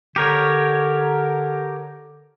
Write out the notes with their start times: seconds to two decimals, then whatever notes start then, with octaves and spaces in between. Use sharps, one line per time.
0.16 D3 G4 A#4 C#5